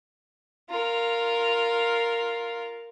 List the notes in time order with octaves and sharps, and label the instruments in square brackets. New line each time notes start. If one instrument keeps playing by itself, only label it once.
[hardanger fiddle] F4 A#4